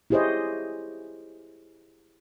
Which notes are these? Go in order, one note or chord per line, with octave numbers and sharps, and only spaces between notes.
E4 G4 G#4 C5 C#5 D#5